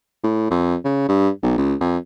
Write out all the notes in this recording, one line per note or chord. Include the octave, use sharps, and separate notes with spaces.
A2
F2
C#3
G2
B1
C#2
F2